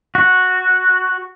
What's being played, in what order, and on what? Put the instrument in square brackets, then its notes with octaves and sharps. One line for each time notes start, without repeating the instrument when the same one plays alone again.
[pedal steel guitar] F#4